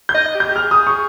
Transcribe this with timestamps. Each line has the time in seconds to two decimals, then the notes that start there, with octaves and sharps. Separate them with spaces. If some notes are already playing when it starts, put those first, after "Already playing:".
0.09 G6
0.14 D#5
0.35 G4
0.40 G6
0.51 G4
0.56 G#4 F6
0.71 D#6
0.87 C#6